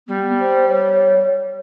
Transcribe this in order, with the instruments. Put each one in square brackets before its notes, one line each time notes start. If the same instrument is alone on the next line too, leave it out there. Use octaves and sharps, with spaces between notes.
[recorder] G3 [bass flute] B3
[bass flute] C5
C#5